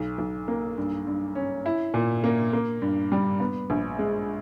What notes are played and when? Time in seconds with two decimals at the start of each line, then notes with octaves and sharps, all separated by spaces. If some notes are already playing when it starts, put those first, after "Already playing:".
Already playing: B1
0.18 B1
0.48 A#3
0.78 G2
1.07 G2
1.35 C#4
1.66 E4
1.94 A#2
2.24 A#3
2.53 A#3
2.82 G2
3.12 G3
3.40 B3
3.70 A#1
3.99 G#3